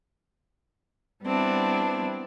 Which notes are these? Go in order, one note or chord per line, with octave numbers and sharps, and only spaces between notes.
G3 B3 C4 D4 E4